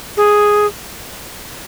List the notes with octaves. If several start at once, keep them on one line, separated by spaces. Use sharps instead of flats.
G#4